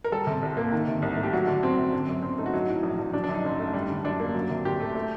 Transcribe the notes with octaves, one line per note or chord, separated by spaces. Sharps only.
A#4
G3 A4
C3
C2
A#3
D#3
C3
C2
A3
G4
F#3 F#4
D3 D4
F#2 C4
F#2
D3
F#2
F#1 C4
A3 D#4
F#4
F#3 D#4
A2
A#1
A#1
F#3 D4
D4
F#2
D#4
F#1
A3
G3
D3
F#2 D4
A#3
F#3
C3
D2 G4
A3
A3